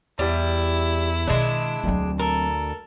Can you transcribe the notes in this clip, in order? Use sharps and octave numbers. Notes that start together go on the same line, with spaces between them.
E2 G3 E4
B2 D#3 G#3 D4
D2 F#3 C4
A4 A#4